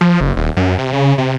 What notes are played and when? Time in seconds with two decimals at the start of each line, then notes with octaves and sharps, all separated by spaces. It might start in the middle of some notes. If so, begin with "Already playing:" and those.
0.01 F3
0.21 F#1
0.37 D#1
0.57 F#2
0.78 C3
0.93 C#3
1.18 C3